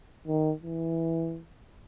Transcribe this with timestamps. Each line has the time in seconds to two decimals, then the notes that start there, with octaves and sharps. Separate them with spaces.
0.27 D#3
0.64 E3